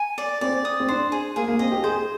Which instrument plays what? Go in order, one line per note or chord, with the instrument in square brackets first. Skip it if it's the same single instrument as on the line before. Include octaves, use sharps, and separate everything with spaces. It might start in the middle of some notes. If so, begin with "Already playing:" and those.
Already playing: [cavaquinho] G#5
D5
[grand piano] C4 [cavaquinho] D5
[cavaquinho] D#6
[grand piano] C4
[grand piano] D4 [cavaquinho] C5
[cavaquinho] G#4
[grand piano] A#3 [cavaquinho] G#4
[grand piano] A#3
[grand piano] C4 [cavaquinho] D#5
[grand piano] G4
[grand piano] G#4 [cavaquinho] C5